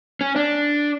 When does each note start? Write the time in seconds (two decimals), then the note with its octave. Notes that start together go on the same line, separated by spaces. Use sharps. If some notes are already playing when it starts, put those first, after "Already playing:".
0.21 C#4
0.36 D4